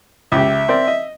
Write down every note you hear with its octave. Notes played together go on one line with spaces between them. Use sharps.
C#2 G4 E5
C4 A#4 D5
D#5